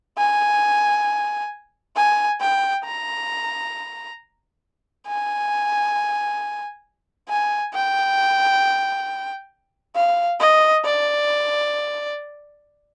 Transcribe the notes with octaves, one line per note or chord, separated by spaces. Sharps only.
G#5
G#5
G5
A#5
G#5
G#5
G5
F5
D#5
D5